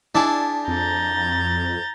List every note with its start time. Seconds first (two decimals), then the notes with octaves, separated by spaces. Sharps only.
0.15 D4 E4 G#4 D5 A5
0.68 F2 A#5 G6 A6